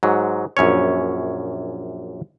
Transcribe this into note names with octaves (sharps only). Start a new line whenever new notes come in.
G#2 F#3
A#1 F#2 C#4 C#5